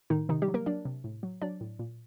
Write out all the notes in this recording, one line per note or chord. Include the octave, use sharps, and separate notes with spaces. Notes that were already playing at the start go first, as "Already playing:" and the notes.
A2 D#3 D#4
C3 D#3 D#4
G3 G4
F#3
A#3 A#4
F#3 D4 D5
C3
A2
F#3
F#3 D4 D5
A2
A#2